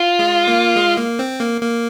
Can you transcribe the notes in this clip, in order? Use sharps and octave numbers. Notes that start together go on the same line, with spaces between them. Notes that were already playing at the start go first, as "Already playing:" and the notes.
Already playing: F4
G#3
A#3
G#3
A#3
C4
A#3
A#3